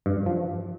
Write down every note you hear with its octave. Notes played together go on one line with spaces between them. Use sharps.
G2
F3